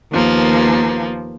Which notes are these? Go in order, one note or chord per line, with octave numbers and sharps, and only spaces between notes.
D#2 F3 A#3 B3